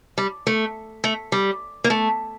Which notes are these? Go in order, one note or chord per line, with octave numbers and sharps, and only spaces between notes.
G3
A3
A3
G3
A#3
A3